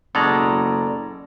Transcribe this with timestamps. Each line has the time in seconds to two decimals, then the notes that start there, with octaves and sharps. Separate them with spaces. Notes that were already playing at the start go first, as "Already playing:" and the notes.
0.15 F#1 B2 G#3 A4 D5 A#5